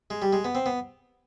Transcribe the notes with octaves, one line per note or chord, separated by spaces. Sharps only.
G#3
G3
G#3
B3
C4
B3